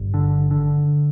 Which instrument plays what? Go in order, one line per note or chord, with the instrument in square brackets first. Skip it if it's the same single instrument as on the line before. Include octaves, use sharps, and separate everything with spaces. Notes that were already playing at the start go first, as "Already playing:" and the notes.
Already playing: [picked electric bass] G1
D3
D3